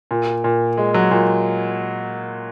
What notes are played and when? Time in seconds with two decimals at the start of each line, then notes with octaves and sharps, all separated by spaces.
0.11 A#2
0.44 A#2
0.77 G#3
0.94 F#3
1.11 A#2